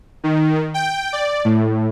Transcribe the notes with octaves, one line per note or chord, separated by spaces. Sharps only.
D#3
G5
D5
A2